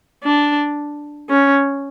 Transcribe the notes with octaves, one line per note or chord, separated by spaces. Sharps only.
D4
C#4